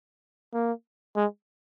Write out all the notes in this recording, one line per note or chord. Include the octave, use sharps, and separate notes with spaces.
A#3
G#3